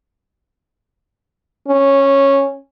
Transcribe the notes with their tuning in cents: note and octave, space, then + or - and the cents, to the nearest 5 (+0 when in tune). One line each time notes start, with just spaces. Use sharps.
C#4 -10